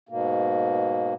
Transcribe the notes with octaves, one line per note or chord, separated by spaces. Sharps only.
G#2 B2 A#3